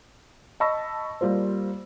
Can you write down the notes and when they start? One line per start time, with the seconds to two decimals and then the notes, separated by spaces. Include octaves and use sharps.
0.60 D#5 A5 B5 C#6 E6 A#6
1.21 G3 A#3 F4 C5